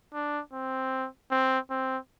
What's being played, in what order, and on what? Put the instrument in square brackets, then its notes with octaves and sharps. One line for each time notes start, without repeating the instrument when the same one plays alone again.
[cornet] D4
C4
C4
C4